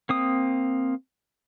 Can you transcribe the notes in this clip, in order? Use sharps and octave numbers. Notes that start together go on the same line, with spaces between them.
A#3 C4 D#6